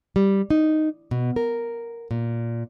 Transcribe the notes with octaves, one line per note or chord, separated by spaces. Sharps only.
G3
D#4
B2
A#4
A#2